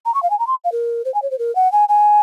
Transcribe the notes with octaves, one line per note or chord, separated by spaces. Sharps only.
A#5
C#6
F5
G#5
A#5
C6
F5
A#4
C5
G#5
C#5
C5
A#4
F#5
G#5
G#5